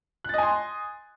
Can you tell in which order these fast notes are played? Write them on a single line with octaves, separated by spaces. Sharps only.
F#6 A6 D#5 G#5 C6